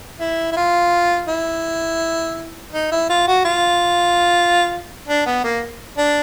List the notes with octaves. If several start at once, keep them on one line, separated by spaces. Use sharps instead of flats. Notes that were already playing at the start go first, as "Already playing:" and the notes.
E4
E4
F4
E4
D#4
E4
F4
F#4
F4
D4
B3
A#3
D4